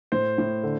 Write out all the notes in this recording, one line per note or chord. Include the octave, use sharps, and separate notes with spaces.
A2 C5
A2
D3